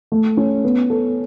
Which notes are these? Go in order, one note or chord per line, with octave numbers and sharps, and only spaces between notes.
A3
C#4
B3
A4